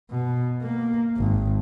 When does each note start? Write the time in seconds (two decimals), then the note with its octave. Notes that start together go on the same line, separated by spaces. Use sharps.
0.11 B2
0.62 A#3
1.17 G#1